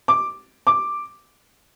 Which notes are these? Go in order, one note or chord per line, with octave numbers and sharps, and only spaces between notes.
D6
D6